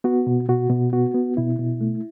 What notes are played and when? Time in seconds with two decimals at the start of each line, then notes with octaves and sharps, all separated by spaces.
0.04 B3 F#4
0.27 B2
0.49 B2 F#4
0.70 B2
0.93 B3 F#4
1.14 B3
1.37 B2 E4
1.59 B2
1.81 A3